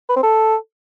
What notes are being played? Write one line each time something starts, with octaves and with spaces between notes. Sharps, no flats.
B4
C4
A4